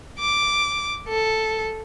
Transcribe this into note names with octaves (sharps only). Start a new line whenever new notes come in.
D6
A4